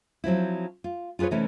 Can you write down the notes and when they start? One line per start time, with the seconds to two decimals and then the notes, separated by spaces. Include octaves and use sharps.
0.24 F3 F#3 C4 E4
0.84 F4
1.19 F4 G#4 A4 B4 C#5
1.31 C3 E3 A3 C#4 D#4 E4